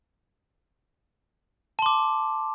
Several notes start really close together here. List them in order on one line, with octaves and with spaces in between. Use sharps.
A5 C6 D6